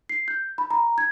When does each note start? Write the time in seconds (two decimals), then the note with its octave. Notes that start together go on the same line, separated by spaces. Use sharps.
0.09 C7
0.28 G6
0.58 B5
0.71 A#5
0.98 G#6